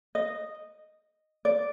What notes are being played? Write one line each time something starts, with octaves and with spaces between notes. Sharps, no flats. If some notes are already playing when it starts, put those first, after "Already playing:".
D#5
D5